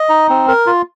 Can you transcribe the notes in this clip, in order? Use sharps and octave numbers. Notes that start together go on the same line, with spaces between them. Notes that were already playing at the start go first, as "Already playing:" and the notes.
Already playing: D#5
D#4
C4
A#4
F4